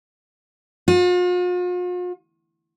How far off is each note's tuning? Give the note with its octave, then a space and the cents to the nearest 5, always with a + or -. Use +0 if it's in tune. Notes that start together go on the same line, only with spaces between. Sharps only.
F4 +45